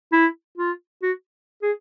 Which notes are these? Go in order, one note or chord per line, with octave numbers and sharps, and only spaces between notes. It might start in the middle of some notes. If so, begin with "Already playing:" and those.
E4
F4
F#4
G#4